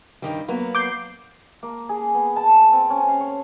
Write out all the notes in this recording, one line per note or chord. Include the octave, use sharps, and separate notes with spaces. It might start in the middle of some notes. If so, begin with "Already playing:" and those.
G2 D#3 G3
F#3 A#3 B3
D6 G6 C7
A#3
G#4
B3
A5
C4
C#4
F5
C#5